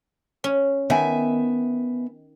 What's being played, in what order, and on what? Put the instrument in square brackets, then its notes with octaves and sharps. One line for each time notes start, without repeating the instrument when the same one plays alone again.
[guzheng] C#4
[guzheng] D#3 [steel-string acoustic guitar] B3 E5 G#5